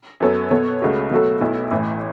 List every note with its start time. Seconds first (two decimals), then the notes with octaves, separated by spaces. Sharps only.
0.20 F#2 F#3 B3 A4 C#5
0.51 B2 B3 A4 C#5
0.82 C#2 C#3 A3 F#4
1.11 B2 F#3 A3 F#4 A4
1.41 B1 B2 A3 E4
1.71 A1 A2 E3